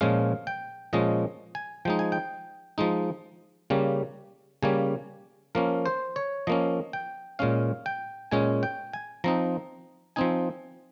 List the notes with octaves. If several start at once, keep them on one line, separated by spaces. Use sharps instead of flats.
A#2 F3 G#3 C#4 F5
G5
A#2 F3 G#3 C#4 D#5
G#5
F3 G#3 D#4 G5
G#5
G5
F3 G#3 D#4
C#3 G3 A#3 C#4
C#3 G3 A#3 C#4 G#5
F3 A#3 C#4 A#4
C5
C#5
F3 A#3 C#4 D#5
G5
A#2 G#3 C#4 F5
G5
A#2 G#3 C#4 G#5
G5
G#5
F3 C4 D#4 A#5
F3 C4 D#4 G#5